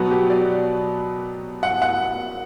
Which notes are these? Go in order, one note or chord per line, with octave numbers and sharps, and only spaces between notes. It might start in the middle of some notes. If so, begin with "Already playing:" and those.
Already playing: B2 F#3 B3 F#4
G4
D5
F#5
F#5